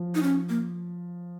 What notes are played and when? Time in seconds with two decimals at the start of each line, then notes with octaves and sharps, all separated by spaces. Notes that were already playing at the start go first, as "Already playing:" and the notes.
Already playing: F3
0.15 D#4
0.23 C#4
0.49 A#3